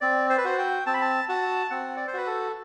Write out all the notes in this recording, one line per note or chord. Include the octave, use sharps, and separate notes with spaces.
C4 D5
C5
B4
F#4 C5
G5
C4 A5
B5
A5
F#4 A5
C4 F#5
D5
C5
F#4 B4
A4